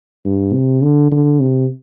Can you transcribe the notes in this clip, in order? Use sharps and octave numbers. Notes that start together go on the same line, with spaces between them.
G2
C3
D3
D3
C3